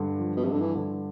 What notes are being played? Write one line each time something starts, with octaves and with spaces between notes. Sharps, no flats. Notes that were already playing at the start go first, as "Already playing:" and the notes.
Already playing: G2 D3
F3
B2
G2 C3
D3
E3
D3